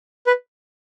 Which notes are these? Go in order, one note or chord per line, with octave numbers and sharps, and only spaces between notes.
B4